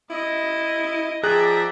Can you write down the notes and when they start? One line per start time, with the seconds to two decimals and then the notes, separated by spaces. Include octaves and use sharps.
0.10 E4 D#5
1.23 F3 G#4 D5 E5 G5 A#5 F#6